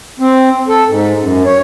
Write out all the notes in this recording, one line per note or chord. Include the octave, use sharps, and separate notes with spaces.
C4
A4
G#2
F#2
C#5